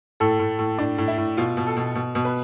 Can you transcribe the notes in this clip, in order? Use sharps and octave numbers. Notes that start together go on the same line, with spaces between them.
A2 A4
A2
A2
A2 D4
A2
E4
A2
B2 F4
B2
A4
B2
B2
B2
B4